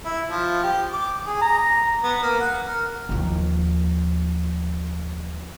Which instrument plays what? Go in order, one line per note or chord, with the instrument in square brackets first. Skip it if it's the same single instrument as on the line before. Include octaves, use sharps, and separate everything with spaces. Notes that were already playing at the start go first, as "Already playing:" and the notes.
[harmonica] E4
F3
G4
D6
G#4
A#5
B3
A#3
F#5
A#4
[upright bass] D#2 F3